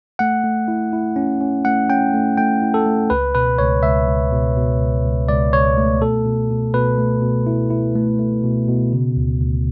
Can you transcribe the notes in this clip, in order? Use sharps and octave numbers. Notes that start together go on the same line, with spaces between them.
A3 F#5
A3
E4
E4
C#4
C#4
A3 F#5
C#4 G5
A3
A3 G5
E4
A4
A3
C#2 B4
B2 B4
C#2 C#5
C#2 E5
C#2
B2
B2
C#2
C#2
C#2 D5
C#2 C#5
A3
B2 A4
B2
B2
B2 B4
A3
B2
E4
E4
A3
A3
B2
B2
C#3
D2
D2